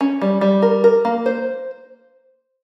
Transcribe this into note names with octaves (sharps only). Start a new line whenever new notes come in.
C#4
G3
G3
A#4
A#4
A#3
C5